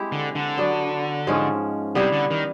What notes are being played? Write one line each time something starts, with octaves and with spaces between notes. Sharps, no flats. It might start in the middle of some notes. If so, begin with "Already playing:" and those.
Already playing: G#3 C4 E4 G4
D3
D3
F#3 B3 D4
G#2 F3 G#3 C#4
C3 G3 B3 E4
D3
D#3